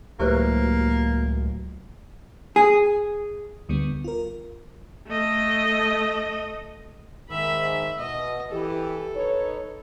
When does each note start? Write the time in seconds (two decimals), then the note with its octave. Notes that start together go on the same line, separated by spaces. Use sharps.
0.20 C#2 A2 F#3 A#3 G4 B4 C5
2.56 G#4
3.69 D2 D3 G3 B3
4.04 F4 A#4
5.08 A3 D#5
7.30 G#2 D#3 E5 B5
7.99 B2 D#5
8.51 E3 G4 A4
9.16 D#4 B4 C#5